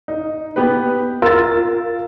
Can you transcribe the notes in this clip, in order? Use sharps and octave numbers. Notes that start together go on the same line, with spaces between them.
D#4
B3 G4 B4
F4 A#4 E6 A6